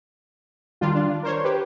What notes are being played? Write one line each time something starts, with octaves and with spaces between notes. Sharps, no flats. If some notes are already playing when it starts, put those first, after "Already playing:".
D#3 G3 D4 F4
D4
A#4 C5 C#5
G4 B4